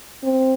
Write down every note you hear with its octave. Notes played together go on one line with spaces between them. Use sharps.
C4